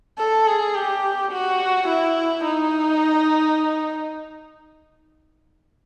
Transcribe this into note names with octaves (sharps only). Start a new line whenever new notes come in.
A4
G#4
G4
F#4
E4
D#4